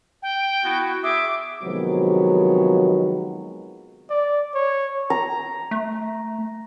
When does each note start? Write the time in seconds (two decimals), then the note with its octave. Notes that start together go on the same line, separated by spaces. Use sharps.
0.23 G5
0.64 B3 E4 F#4
1.03 G#4 E5 D6
1.62 C3 D#3 F3 F#3 G#3 B3
4.10 D5
4.54 C#5
5.10 A#5
5.71 A3